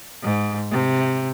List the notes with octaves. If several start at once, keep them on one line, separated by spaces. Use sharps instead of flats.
G#2
C3